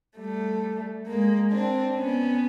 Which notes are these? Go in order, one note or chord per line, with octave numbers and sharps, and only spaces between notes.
G3 A3
G#3 A#3
C4 D4
B3 C#4